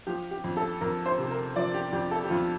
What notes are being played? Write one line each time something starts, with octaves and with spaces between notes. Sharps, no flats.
F3 G4
G4
F2
A4
F2 A#4
C5
C3
A#4
F3 D5
G4
F2 G4
A4
G4
F2 F4